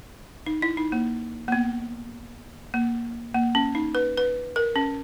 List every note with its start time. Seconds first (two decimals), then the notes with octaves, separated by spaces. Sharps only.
0.46 D#4
0.62 E4
0.77 D#4
0.92 A#3
1.48 A#3
1.52 B3
2.74 A#3
3.35 A#3
3.55 C#4
3.75 D#4
3.95 B4
4.18 B4
4.56 A#4
4.76 C#4